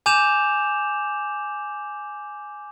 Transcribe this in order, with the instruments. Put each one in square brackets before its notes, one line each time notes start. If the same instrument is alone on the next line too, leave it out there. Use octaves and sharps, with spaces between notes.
[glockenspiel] G#5 D6 G6 E7 F7